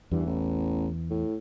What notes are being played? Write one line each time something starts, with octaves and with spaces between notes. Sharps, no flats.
E2 G2 E3
A1
A2